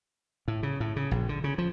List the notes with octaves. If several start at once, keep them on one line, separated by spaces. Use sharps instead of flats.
A2
C#3
A2
C#3
A#1
D3
C#3
F3